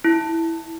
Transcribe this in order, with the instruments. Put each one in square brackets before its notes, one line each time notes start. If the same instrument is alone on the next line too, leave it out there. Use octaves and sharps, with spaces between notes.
[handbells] E4